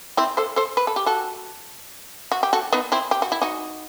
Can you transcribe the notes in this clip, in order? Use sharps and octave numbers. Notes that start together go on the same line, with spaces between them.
C4 E4
A4 C5
A4 C5
B4
A4
G4
F#4 A4
F#4
G4
F#4 A4
B3 D#4
C4 E4
G4
F#4
E4
D#4 F#4